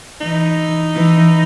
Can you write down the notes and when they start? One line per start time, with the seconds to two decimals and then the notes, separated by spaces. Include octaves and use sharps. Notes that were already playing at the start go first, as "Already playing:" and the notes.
0.21 E3 D#4
0.95 E3